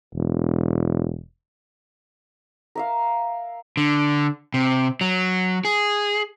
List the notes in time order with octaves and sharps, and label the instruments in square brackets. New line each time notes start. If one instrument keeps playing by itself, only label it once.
[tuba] E1
[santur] A#4 E5 F5
[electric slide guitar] D3
C3
F#3
G#4